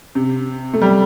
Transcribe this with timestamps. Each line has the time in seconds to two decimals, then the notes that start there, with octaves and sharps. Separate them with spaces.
0.15 C3
0.73 A3
0.82 G3